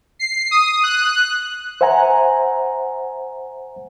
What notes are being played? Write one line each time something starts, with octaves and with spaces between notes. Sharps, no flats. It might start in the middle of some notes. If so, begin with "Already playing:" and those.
C7
D#6
F#6
C5 E5 F#5 G#5 A#5